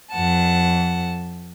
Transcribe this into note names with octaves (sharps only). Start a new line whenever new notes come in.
F2 F#5 A5